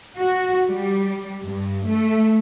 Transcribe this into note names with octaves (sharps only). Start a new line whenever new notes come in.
F#4
G3
G2
A3